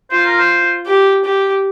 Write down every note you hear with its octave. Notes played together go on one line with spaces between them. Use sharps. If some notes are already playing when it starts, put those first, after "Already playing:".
F4 C5
A#4
C5
G4
G4